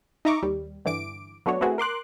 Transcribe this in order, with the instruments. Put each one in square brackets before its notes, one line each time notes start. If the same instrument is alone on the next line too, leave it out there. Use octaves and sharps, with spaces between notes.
[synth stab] D#4 D#5 E5 A#5 C#6 D6
D#2 G3
G2 D3 E3 D6 D7
F#3 A3 B3 D4 F#4 C#5
A3 B3 C4 E4 F#4 G#4
A#4 C6 D6 F#6